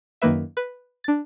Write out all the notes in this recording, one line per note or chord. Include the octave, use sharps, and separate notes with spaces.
F#2 D#3 A#3 B4 E5
B4
D4 A6